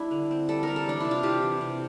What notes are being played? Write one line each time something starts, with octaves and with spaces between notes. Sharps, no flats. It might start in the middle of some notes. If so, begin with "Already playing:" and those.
Already playing: G3 D4 E4
D3
C4
G3 A4
G3 A#4
A4
E3 D4
C3 E4
F4
C3 G4
E3
C3